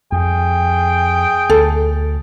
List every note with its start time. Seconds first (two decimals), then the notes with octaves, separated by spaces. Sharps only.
0.12 F2 G#4 G5
1.50 D2 A4